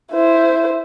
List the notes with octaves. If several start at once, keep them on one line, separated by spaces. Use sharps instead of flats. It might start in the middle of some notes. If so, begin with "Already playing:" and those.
E4 C5